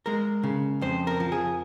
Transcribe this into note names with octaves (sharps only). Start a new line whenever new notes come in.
G#3 A#4
C#3
F2 C5
A#4
F3
G#4